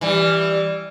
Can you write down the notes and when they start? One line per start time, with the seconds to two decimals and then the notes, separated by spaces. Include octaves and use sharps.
0.01 E3 G3